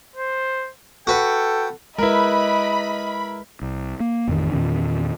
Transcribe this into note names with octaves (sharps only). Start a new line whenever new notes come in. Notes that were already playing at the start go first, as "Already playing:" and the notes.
C5
F#4 A4 B4 G5
G#3 E4 A#4 B4 D#5 B5
C2
A#3
A1 F2 D#3
E2 A#2 D#3 C#4